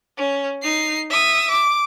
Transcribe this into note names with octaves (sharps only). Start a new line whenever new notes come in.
C#4
D#4 C7
E5 D#6
D6